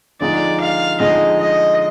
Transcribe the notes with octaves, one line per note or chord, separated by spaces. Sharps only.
D3 F3 G#3 D#4 D5
F5
D3 F3 G#3 D#4 D#5
D#5